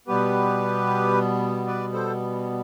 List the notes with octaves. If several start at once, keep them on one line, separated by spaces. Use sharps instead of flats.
B2 G3 B3 G4 B4
B4 D5
A4 C5